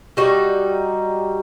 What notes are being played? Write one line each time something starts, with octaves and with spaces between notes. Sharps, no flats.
G3 D#4 F#4